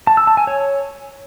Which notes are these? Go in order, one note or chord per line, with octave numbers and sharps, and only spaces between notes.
A5
E6
A5
G#5
C#5